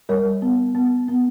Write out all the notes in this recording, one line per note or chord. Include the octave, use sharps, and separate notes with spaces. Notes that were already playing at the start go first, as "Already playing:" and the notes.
G3 A#4 C#5
B3
B3
B3